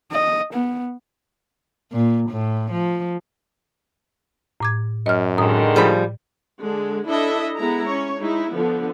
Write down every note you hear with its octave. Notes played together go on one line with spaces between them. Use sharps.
D#5
B3
A#2
A2
F3
A2 D6 G#6
F#2 D#5 F6
A2 D3 D#3 G#3 D#6
F3 G3 G#4 B5
D3 G#3
D4 E4 A4 D#5 E5
G#3 B3 E4 A#5
C#4 C#5
G#3 D#4 E4
D3 F3 B3